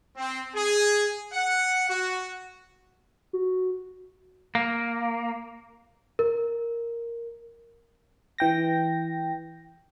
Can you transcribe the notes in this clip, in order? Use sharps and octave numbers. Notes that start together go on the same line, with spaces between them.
C4
G#4
F#5
F#4
F#4
A#3
A#4
E3 G5 A#6